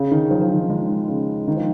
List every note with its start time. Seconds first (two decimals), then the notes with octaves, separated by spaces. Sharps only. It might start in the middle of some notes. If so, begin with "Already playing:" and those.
Already playing: C#3
0.11 D#3
0.31 F3 F#3
0.41 F3
0.51 D#3
0.70 D#3 G#3
1.09 C#3
1.48 D#3
1.57 F3